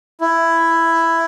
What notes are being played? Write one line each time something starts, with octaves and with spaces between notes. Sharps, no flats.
E4